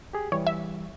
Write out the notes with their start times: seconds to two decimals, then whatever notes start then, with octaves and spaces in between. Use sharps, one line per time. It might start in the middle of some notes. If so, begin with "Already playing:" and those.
0.13 G4 G#4
0.32 E3 G3 C#5
0.47 E5